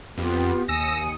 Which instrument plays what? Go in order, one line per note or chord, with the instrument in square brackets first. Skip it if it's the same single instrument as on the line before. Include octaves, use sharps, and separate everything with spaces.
[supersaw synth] F2 [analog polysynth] B3 G4 [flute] F4
[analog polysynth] D#2 D#6 C#7 [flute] G#5 [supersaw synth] E6 A#6